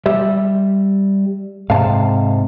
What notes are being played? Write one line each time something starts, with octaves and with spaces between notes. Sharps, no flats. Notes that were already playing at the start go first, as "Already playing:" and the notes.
G3 G4 E5
G#2 C3 F5 A5